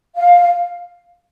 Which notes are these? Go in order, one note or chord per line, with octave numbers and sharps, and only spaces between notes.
F5